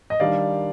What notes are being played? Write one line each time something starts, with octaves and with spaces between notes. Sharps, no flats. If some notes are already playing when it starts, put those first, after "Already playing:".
D#5
D#3 G3 D4 D5 F5